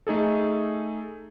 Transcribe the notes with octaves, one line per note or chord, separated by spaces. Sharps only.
A3 D#4 G#4 A4